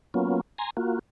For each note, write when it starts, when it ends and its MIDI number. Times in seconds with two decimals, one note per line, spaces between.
0.14 0.41 54
0.14 0.41 58
0.14 0.41 59
0.14 0.41 61
0.14 0.41 65
0.58 0.70 80
0.58 0.70 82
0.58 0.70 84
0.77 0.99 58
0.77 0.99 65
0.77 0.99 66